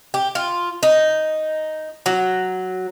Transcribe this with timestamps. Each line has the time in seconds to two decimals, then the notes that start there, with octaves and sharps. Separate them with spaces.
0.14 G4
0.35 F4
0.83 D#4
2.06 F#3